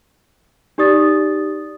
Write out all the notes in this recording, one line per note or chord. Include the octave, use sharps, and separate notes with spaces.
D#4 G4 D5 D#6 A6